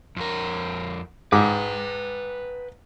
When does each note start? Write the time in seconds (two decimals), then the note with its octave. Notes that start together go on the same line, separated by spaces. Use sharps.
0.17 F2 A#4
1.32 G#2 B4 G5 D6